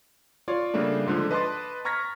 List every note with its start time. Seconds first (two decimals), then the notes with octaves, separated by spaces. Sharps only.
0.48 F4 C#5 D5
0.74 C#3 G3 A3 A#3 D4
1.06 G#2 D3 F3
1.31 B4 D#5 A5 C6 D6 A6
1.85 A#5 C#6 F6 G#6 A#6 B6